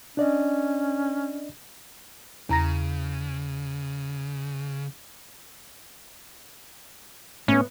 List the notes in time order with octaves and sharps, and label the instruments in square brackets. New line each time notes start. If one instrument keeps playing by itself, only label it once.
[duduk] C#4 [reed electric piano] D4 D5 D#5
[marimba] E2 A#5 A#6 [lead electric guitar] C#3
[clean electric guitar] A2 B3 [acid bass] C#4